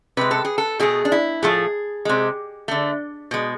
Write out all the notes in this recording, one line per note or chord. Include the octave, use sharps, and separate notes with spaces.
C3 G#3 B4
A4
G#4
A4
B2 A3 G#4
D4
E4
A2 F3 A3 G#4
C3 G#3
D3 A3
B2 G#3